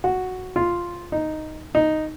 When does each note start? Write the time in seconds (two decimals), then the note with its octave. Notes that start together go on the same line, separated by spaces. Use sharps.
0.04 F#4
0.56 F4
1.12 D#4
1.75 D#4